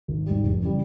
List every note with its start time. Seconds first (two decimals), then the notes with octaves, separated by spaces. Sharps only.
0.08 G#1
0.26 G#2 G3
0.43 F1
0.62 C#3 E3 G3